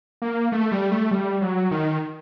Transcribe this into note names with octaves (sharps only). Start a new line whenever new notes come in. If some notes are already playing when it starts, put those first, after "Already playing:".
A#3
A3
G3
A3
G3
F#3
D#3